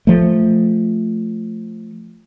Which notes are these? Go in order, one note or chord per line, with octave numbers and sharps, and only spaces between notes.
F3 A3